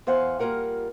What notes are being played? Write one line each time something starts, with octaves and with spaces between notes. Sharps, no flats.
E2 C5 F5 F#5 G#5
G3 A#3 F4 A#4 F#5